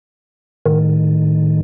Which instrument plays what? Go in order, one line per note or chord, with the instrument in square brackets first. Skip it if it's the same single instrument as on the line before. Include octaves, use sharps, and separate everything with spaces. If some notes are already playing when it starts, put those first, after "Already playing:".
[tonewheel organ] A2 D#3